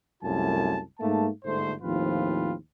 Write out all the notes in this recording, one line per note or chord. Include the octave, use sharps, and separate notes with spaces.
C2 F#2 A3 F4 G#5 A5
G#2 A3 A#3 A5
G1 G#2 D3 A3 C5
D#2 A2 F3 C4 F4 B4